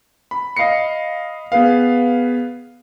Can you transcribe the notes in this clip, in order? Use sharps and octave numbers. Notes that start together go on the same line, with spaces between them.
B5
D#5 F5 B5 C7 C#7
B3 G#4 B4 F5